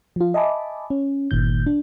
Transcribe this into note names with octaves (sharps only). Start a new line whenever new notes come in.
F3 F4
D#5 E5 G#5 A5 B5 D6
C#4
G1 A#2 D#3 G6
D4